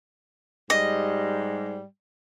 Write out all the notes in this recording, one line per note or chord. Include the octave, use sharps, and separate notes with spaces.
G#2 G3 D#5